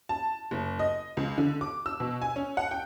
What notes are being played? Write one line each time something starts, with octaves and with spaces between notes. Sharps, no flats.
A5
F#1
D#5
C#2
D3
D6
E6
B2
G#5
C#4
F#5
G5